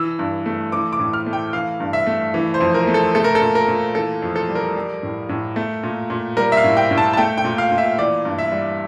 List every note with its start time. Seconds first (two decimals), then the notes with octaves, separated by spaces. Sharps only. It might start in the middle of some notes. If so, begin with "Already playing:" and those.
Already playing: E3 E6
0.19 G2
0.46 A3
0.72 E3 D6
0.93 D6
1.00 A2
1.13 F6
1.26 A3
1.33 G5
1.53 E3 F5
1.80 G2
1.93 E5
2.07 A3
2.34 E3
2.54 C5
2.61 F2
2.74 A#4
2.87 A3
2.94 A4
3.15 A3 A4
3.24 A#4
3.35 A4
3.41 A#2
3.55 A#4
3.68 A#2
3.95 E3 A4
4.22 F2
4.36 A4
4.49 G3
4.55 A#4
4.76 G3
5.03 A2
5.29 A2
5.56 A3
5.83 A#2
6.10 A#2
6.37 G3 A#4
6.52 E5
6.57 F5
6.64 A2
6.77 G5
6.91 A2
6.98 A5
7.13 A5
7.17 A3 G5
7.38 G5
7.44 A#2
7.58 F5
7.72 A#2
7.78 E5
7.98 E3 D5
8.25 G2
8.38 E5
8.52 G3